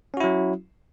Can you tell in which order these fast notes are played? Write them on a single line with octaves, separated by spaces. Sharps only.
C#4 F#4 E4 F#3